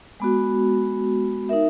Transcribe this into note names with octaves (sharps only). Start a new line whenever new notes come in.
G#3 B3 F#4
D#4 A#4 E5